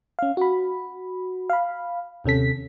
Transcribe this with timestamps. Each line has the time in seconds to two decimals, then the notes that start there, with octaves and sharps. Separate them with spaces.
0.19 C#4 F5
0.37 F#4 B5
1.50 F5 B5
2.24 D#2 C3 C#4 A4 B6